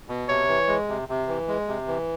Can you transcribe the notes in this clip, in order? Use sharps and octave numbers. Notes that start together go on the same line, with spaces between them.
B2
C3 C#5
E3
G#3
C3
C3
E3
G#3
C3
E3